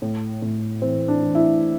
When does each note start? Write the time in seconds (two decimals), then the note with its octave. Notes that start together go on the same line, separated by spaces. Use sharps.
0.02 A2
0.42 A2
0.81 E3 C4
1.08 D4
1.22 E3
1.35 E4